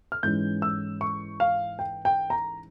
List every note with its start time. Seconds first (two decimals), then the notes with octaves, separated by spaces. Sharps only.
0.12 F6
0.23 G#2 E3 G#3 C#4 G6
0.62 E6
1.01 C#6
1.40 F5
1.79 G5
2.05 G5
2.30 A#5